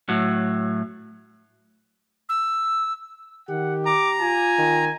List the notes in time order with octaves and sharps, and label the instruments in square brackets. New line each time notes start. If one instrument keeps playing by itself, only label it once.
[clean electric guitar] A2 F#3
[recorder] E6
[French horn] D#3 [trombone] G4 [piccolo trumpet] F#5
[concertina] A#5 [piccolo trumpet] D6
[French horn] F4 [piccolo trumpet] G#5
[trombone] D#3